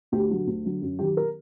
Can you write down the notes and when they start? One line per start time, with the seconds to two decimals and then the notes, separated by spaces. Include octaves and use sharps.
0.12 D2 G4
0.29 D3 F#3 F#4
0.47 D2
0.65 D3 F#3
0.81 F#2
0.99 D#3 F#3 G4
1.17 A#4